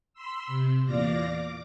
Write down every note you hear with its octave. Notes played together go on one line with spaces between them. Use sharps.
B5 C6 E6
C3
E2 A#2 D5 F5 D6 A#6
D6